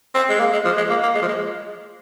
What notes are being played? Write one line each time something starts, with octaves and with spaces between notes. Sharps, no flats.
C4
G#3
A#3
G#3
F3
G#3
A#3
A#3
G#3
F3
G#3